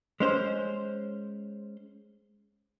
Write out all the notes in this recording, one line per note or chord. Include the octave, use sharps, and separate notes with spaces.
G#3 C#4 C5